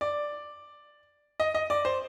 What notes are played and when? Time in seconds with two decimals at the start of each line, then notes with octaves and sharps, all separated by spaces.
0.01 D5
1.40 D#5
1.55 D#5
1.70 D5
1.85 C5